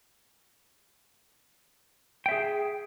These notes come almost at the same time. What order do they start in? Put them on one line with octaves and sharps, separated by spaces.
G5 E5 G#4